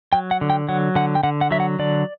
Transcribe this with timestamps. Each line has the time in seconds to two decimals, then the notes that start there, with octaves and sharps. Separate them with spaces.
0.13 F#3 G5
0.31 F#5
0.41 D3
0.50 G5
0.69 F#3 F#5
0.95 D3 F#5
1.15 G5
1.23 D3 F#5
1.41 F#5
1.51 F#3 E5
1.60 F#5
1.79 D3 D5